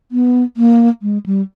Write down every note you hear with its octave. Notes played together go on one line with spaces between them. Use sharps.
B3
A#3
G#3
G3